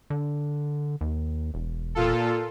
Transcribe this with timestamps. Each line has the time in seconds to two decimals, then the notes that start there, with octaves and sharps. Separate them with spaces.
0.10 D3
1.01 D#2
1.54 E1
1.95 A#2 F4 A4